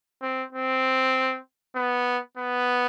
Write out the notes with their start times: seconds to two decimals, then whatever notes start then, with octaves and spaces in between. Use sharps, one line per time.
0.22 C4
0.53 C4
1.76 B3
2.37 B3